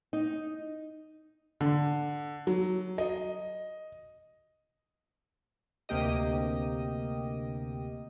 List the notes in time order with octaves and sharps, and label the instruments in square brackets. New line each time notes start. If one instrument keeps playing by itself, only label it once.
[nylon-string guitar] D#4
[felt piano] D3
F#3
D#5
[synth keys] D2 C3 A#3 G4 D#5